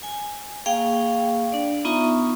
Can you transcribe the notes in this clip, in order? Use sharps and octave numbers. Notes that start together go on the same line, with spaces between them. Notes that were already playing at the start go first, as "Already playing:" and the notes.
G#5
A#3 G#4 F5 G5 C#6
D4 D5
B3 D#4 F4 E5 A#5 C#6